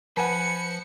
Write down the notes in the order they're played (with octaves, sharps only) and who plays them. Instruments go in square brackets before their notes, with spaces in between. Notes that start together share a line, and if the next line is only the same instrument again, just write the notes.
[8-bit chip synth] F3 [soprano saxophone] B4 [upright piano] F#5 G#5 A5 [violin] C#7